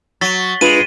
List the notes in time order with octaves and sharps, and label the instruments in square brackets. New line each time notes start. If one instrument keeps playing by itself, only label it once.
[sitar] F#3 [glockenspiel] A6 B6 G7
[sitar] G#3 [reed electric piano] D4 F4 B4 [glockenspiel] D#7